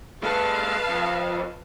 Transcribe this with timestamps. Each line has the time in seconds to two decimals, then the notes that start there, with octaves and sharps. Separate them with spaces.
0.23 G#3 A4 B4 F5 A5
0.89 F2